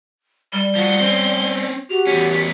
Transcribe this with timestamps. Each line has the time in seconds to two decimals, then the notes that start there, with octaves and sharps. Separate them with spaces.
0.53 G3 G7
0.75 F3 F#4
1.00 C4 C#4
1.90 F#4 G4 F7
2.07 E2 C#4 B6